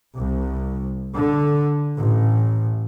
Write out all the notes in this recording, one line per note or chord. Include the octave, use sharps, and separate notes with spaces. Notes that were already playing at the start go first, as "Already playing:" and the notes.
C2
D3
A1